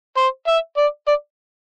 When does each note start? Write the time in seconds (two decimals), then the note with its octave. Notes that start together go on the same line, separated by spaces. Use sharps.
0.17 C5
0.48 E5
0.77 D5
1.08 D5